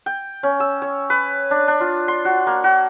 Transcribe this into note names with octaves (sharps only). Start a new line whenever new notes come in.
G5
C#4
E6
C#5
B4
D4
D4
F4
C6
F#4
A#3
F#4